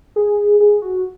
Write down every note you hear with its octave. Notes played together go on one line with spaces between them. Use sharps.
G#4
G#4
F#4